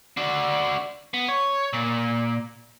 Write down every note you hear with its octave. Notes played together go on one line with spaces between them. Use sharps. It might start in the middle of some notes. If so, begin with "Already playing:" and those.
D4 F#4
B3
C#5
A#2